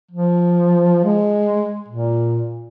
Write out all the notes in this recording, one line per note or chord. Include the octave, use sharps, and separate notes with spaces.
F3
G#3
A#2